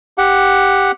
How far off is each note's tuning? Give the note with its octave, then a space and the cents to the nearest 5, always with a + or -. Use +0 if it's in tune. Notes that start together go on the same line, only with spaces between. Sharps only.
G4 +0 F#5 +0